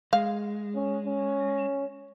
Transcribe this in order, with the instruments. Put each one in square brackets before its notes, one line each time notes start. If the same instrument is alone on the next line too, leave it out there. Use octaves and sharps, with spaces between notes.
[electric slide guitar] G#3 [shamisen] F5
[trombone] C#4
C#4